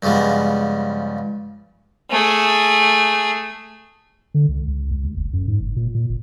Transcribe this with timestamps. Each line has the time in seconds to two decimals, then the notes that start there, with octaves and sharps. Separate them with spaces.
0.02 G2 C#3 F3 G#3 B3
2.11 A3 G#4
4.34 D3
4.49 C#2
4.68 C#2
4.91 C#2
5.04 D2
5.17 F#1
5.33 F#2
5.48 G#2
5.61 F#1
5.76 A#2
5.95 A#2
6.09 F#1